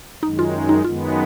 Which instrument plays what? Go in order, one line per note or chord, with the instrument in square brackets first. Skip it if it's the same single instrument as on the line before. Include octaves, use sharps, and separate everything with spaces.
[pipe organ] F#2 D#3 G#3 [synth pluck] D#4
[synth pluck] F4
D#4
[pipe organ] F#2 D#3 G#3 B3 [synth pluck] F4